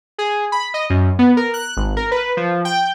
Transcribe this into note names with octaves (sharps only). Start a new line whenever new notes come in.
G#4
B5
D#5
F#2
B3
A#4
F#6
G#1
A#4
B4
F3
G5